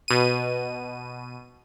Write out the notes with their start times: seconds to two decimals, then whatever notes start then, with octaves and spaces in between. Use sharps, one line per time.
0.08 B2 D#7